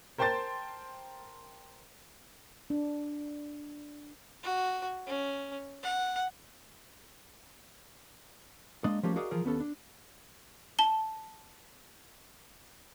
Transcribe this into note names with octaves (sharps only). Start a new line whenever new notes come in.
A#4 C5 G5 A5 C6 A6
D4
F#4
C#4
F#5
G#3 A#3 D4 D5 D#5
F3 G3 A3 A#3 C#4 G4
F#4 G#4 A#4 D5 D#5 F5
E3 F3 F4 G#4 A#4
D#2 B3 C#4 A4
D4
A5 G7